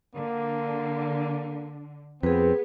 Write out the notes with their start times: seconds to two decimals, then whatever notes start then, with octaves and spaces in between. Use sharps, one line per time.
0.15 D3 A#3
2.23 F2 B3 C4 G#4 B4